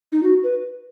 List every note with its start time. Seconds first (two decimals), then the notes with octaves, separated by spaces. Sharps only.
0.12 D#4
0.23 F#4
0.43 B4